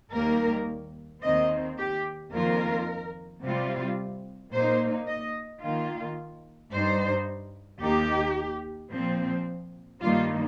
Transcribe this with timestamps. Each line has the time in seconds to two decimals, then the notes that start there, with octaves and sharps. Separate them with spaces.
0.13 D#2 D#3 G3 A#3 A#4
1.23 D#2 D#3 C4 D#5
1.78 G4
2.33 F2 D#3 A#3 F4 A#4
3.42 C3 G3 C4 F4
4.52 A#2 A#3 D#4 C5
5.07 D#5
5.62 D#3 A#3 F4
6.71 G2 G3 D#4 C5
7.81 D#2 D#3 A#3 D#4 G4
8.91 A#2 F3 C4
10.01 G2 D#3 G3 A#3 D#4 F4